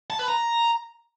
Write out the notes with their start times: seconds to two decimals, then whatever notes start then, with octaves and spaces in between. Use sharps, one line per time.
0.10 A5
0.19 B4
0.28 A#5